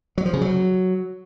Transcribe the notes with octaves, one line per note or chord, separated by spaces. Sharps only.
F#3
F3
C#3
F#3